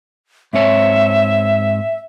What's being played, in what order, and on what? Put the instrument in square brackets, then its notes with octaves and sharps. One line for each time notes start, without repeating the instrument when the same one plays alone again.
[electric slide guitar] G#2 C4 C#5 [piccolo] E5